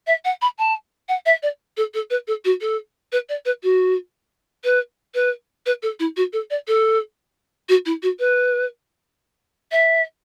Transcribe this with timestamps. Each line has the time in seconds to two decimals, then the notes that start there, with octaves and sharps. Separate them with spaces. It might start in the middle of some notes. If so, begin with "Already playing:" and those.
0.07 E5
0.25 F#5
0.42 B5
0.59 A5
1.09 F#5
1.26 E5
1.43 D5
1.77 A4
1.94 A4
2.10 B4
2.27 A4
2.45 F#4
2.61 A4
3.12 B4
3.29 D5
3.45 B4
3.63 F#4
4.64 B4
5.14 B4
5.66 B4
5.83 A4
6.00 E4
6.16 F#4
6.33 A4
6.50 D5
6.68 A4
7.69 F#4
7.86 E4
8.02 F#4
8.19 B4
9.72 E5